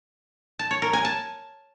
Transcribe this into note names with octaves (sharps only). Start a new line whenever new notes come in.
A5
C#5
A#4
G#5
A5